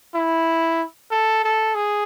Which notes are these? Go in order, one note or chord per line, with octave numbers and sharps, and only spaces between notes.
E4
A4
A4
G#4